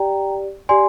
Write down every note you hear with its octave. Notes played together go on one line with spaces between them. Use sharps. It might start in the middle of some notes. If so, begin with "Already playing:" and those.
Already playing: G4 D5 G5 A#5
G4 D5 G#5 C6